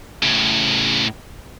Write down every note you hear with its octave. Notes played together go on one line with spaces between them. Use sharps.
A2 C#3